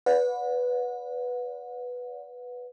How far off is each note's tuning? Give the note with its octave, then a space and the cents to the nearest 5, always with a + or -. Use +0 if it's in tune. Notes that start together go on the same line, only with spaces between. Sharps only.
B4 +0 D5 -35 F#5 -30